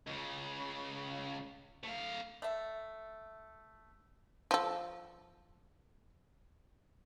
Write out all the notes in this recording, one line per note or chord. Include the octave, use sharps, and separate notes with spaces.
C#2 C#3
A3 F5
A3 E5
F3 A4